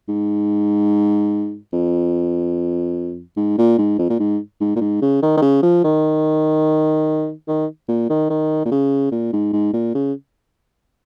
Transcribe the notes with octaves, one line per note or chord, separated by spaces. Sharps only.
G#2
F2
G#2
A#2
G#2
F2
A#2
G#2
G#2
A#2
G#2
C#3
D#3
D#3
C#3
F3
D#3
D#3
A#2
D#3
D#3
A#2
C#3
A#2
G#2
G#2
A#2
C#3